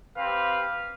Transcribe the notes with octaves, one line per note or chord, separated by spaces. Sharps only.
C4 G4 B4 F5